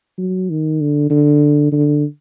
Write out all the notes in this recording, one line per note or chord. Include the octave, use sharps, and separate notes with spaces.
F#3
D#3
D3
D3
D3